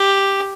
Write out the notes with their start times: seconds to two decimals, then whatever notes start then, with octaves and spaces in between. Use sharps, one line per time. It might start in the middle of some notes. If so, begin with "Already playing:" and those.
Already playing: G4